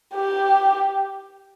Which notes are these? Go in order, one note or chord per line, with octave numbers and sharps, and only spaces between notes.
G4